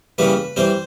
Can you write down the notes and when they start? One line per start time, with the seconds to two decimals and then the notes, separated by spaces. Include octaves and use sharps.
0.18 C#3 E3 G3 A#3 B4
0.56 E3 G3 C4 C5